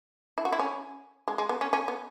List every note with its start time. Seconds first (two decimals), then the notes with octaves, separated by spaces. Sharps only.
0.38 E4
0.45 F#4
0.52 E4
0.59 C#4
1.28 G#3
1.38 G#3
1.49 B3
1.61 C#4
1.73 C#4
1.88 B3